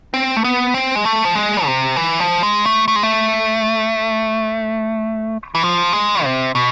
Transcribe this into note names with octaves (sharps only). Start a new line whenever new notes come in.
C4
A3
B3
C4
G#3
A3
F3
G#3
C3
E3
F3
G#3
A3
A3
G#3
A3
E3
F3
G#3
C3
B2